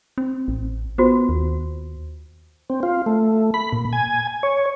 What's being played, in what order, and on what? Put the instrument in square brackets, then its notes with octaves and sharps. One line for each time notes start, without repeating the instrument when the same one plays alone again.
[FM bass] C4
A1
[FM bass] B3 [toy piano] F4 F#4 C5
[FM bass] D#2
[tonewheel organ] C4
F4
A3
B5
A#2
G#5
C#5